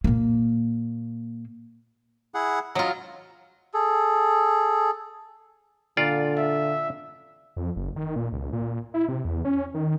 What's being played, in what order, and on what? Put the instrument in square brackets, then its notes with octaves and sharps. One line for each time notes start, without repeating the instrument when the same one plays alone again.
[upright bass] A#2 A#3
[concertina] E4 G#4 F#5
[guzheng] F#3 F4 [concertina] D#5
[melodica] G#4 A4
[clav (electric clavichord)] A#2 F4 D5 [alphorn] D3
[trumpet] E5
[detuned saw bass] F2
F#1
D#3
A#2
C#2
A#2
E4
C3
E2
C#4
D#3